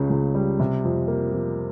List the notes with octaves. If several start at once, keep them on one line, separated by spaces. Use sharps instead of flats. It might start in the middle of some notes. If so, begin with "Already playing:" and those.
Already playing: C#2 C#3
C#2
G3
C3
F2
A#3
F2